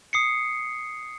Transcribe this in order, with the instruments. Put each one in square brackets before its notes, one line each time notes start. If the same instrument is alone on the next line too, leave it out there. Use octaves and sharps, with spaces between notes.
[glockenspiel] D#6 C7 C#7